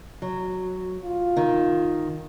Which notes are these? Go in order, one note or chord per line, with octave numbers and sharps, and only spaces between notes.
F#3
F4
D#3